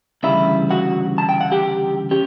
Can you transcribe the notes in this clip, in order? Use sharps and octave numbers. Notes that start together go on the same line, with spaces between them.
D2 C#3 E3 G3 E4 E5
F#4 F#5
A5
G5
F#5
G4 G5
C#4 G4